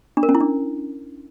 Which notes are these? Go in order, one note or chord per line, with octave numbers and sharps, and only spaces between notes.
D4
A#4
C#4
E4
D4